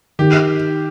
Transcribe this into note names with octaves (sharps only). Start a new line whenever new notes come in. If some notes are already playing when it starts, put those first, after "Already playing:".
D#3 G4